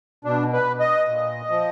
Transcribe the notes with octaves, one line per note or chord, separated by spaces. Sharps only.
B2 D4
B4
D#5
A#2
F3